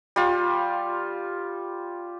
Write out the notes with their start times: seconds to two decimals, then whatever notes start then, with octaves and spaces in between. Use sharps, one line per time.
0.16 G3 F4